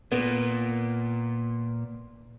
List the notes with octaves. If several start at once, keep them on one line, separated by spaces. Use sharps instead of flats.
A#2 B3